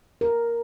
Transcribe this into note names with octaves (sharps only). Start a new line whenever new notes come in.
A#4